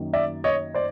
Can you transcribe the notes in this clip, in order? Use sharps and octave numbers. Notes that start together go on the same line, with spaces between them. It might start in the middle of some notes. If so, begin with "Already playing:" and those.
Already playing: F#2 D#3 F#3 A#3
D5 E5
C#5 D#5
C5 D5